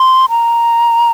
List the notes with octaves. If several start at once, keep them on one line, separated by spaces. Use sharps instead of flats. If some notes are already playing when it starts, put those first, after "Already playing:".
Already playing: C6
A#5